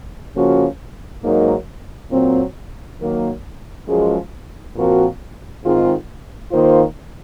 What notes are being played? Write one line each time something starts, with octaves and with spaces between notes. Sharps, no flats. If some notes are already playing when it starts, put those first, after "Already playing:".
C#3 F3 A#3 C#4 F#4
G#2 F#3 A#3 D#4 A#4
A#2 F#3 C4
D#3 F#3 A#3
F#2 F3 G#3
A#2 F3 C4 F#4 A#4
G#2 D#3 G#3 C4 F4
D#3 A#3 F4 C5